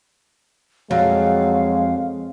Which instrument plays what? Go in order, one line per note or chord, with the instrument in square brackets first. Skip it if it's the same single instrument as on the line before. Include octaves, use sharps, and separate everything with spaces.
[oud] F2 [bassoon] F#3 [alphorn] G#3 [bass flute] F5